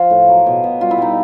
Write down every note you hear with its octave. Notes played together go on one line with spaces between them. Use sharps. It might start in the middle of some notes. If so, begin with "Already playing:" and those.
Already playing: F3 F4
A2
F#3
B2
B2
G3 F4
E4
G3 D#4